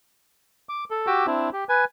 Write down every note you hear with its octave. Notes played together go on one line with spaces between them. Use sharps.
D6
A4
F#4 G4 D6 E6
C4 D4 E4
G4
B4 G#5